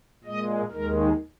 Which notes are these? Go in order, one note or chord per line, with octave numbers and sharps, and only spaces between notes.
A#2 G#3 D#5
D#2 D#3 G#3 A#4